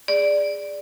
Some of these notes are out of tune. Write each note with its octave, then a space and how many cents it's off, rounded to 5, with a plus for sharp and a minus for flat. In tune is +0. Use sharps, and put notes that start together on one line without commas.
G#4 -10 D5 +0